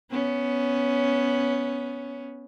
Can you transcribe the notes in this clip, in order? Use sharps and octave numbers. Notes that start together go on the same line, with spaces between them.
B3 C#4